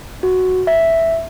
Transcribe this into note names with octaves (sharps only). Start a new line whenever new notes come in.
F#4
E5